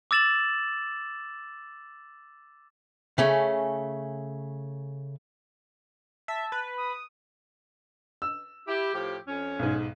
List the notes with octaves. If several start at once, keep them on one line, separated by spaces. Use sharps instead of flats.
D6 E6 A6 E7 F#7
C#3 A3 C#4
E5 A5
B4
D#6
E6
E4 G4
A2 F3 G4
F2 C#4
B1 G#2